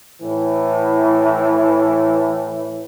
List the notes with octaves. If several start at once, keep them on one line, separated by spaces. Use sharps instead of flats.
A2 E3